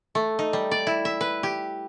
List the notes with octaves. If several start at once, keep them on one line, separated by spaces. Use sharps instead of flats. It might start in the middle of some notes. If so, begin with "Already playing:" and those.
A3
D#4
G3
D5
E4
E5
B4
G4